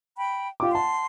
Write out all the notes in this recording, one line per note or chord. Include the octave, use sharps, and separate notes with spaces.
G5 B5
F4 G4 D6
F#5 A5 C6